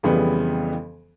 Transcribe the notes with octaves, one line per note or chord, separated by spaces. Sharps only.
F2 C#3 E3 G3 B3